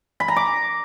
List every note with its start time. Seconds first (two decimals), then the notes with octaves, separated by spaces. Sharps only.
0.20 B5
0.28 A#5
0.36 D6